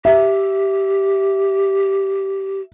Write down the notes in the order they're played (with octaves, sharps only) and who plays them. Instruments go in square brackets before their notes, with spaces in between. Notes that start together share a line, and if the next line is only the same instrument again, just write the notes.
[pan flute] G4 [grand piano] E5